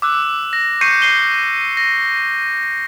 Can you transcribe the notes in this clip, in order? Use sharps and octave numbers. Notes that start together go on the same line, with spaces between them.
D6 E6 F#6
A#6
C#6 G6 C7 C#7 D#7
C7 G7
A#6